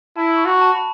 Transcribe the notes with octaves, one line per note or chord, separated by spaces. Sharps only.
E4 A5
C#6
F#4 B5
A5
B5